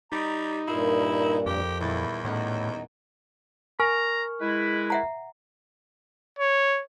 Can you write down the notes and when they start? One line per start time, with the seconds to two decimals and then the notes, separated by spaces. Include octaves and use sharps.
0.12 G3 D#4 G4 A#5 B5
0.67 G2 A#2 E4 F4 A#4
1.46 F2 G4
1.80 D#1 E2 E4 A6
2.25 A2 B3 C#4 D#4 F#5
3.80 A#4 G#5 A#5 C#6 F6
4.41 G#3 E4 B4
4.90 E5 F#5 A#5
6.39 C#5